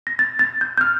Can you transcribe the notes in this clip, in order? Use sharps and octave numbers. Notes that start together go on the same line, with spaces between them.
A#6
A6
A6
G6
G6
F6